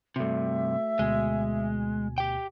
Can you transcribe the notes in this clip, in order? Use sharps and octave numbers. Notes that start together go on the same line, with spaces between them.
G2 C3 A3 F#4 E5
D2 B2 G#3 G#5
G4 G5